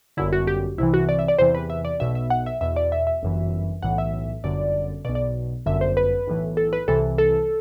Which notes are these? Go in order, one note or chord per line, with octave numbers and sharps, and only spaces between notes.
G1 F#2 D3 E4
F#4
G4
C2 C3 E3 E4
F#4
D5
E5
D5
E2 C3 E3 C5
B4
E5
D5
B1 B2 E5
E5
F#5
E5
E2 B2 E5
D5
E5
E5
G1 F#2 E3
B1 A2 E3 F#5
E5
G1 F#2 D3 D5
B1 B2 D5
D5
G1 F#2 D3 E5
C5
B4
B1 A2 E3
A4
B4
C2 C3 E3 A4
A4